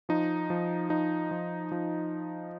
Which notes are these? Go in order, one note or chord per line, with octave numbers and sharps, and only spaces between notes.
F3 D#4
F3
F3 D#4
F3
F3